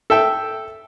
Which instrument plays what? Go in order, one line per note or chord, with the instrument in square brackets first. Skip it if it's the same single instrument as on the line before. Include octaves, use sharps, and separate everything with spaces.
[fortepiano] A4 E5 G5